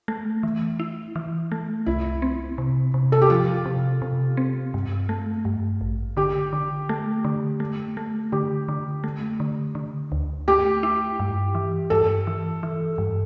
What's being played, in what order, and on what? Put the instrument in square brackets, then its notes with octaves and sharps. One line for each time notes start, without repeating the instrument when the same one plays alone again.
[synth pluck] A3
E3
E4
E3
A3
[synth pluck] C2 [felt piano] E4
[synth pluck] C4
C3
C3
[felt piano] A4
G4
[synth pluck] F3 [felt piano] F4
[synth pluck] C3
C3
C4
G2
A3
G2
A1
[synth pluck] D3 [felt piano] G4
[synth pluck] D3
A3
D3
A3
A3
[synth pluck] D3 [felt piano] G4
[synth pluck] D3
A3
D3
D3
D2
[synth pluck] A3 [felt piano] G4
[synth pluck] E4
G2
E3
[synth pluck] G2 [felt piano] A4
[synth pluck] E3
E3
G2